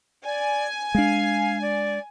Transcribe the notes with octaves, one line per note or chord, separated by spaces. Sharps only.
D5 G#5
G#3 D4 F5
D5